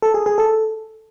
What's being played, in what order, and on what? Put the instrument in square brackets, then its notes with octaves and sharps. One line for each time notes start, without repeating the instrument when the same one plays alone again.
[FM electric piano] A4
G#4
G#4
A4